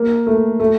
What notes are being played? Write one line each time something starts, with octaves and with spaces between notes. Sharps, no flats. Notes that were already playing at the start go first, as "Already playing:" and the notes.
Already playing: A#3
A3
A3